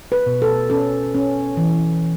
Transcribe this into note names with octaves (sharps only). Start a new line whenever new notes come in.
B4
B2
A4
C#4 A4
C#4
E3